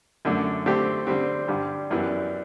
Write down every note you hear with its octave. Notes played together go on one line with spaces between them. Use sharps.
F#2 D3 A3
D3 A3 C4 G4
D3 G3 C4
G2 D3 G3
F#2 E3 G3 B3